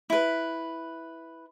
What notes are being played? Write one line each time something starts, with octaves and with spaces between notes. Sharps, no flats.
E4 B4